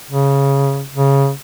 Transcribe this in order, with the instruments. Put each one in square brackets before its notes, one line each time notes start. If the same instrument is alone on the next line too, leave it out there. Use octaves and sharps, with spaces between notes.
[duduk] C#3
C#3